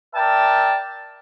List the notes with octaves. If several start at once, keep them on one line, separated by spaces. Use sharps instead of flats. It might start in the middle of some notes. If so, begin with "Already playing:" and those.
A#4 D5 E5 G5 A5